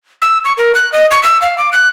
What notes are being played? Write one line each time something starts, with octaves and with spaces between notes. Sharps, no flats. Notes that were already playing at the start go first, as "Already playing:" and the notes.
E6
C#6
A#4
F#6
D#5
C#6
E6
F5
D6
F#6